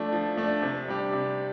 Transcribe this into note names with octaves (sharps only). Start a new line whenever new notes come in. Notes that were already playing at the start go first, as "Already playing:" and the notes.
Already playing: F3 A3 D4
F3
A3 D4
C3
G3 D4 G4
C3